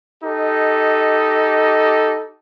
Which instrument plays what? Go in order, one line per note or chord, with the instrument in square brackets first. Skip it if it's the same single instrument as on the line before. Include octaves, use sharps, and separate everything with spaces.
[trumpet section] D#4 G4 A4 D#5